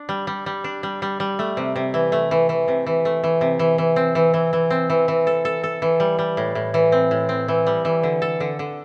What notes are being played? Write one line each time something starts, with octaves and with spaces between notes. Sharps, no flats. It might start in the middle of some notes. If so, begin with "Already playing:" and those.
Already playing: D4
G3
G3
G3
D4
G3
G3
G3
A3
C3
C3
E3
A3
E3
E3
C3
E3
A3
E3
C3
E3
E3
C4
E3
E3
E3
C4
E3
E3
A4
A4
A4
E3
G3
G3
A2
A2
E3
C4
A2
C4
E3
G3
E3
D3
A4
D3
D3